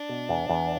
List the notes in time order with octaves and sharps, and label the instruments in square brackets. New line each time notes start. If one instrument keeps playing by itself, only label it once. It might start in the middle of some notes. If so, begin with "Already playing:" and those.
Already playing: [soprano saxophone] D4
[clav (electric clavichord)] B2
E2
E2